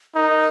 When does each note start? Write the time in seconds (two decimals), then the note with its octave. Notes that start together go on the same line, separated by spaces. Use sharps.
0.15 D#4 A#4